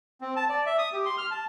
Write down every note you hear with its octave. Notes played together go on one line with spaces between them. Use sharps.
C4
A5
D5
E5
D#6
G4
C6
F6
A5